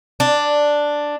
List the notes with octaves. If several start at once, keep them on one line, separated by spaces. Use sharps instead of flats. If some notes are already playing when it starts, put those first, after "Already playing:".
D4